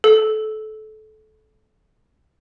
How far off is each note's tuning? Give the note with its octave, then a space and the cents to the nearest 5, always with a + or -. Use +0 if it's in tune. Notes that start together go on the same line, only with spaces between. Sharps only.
A4 -25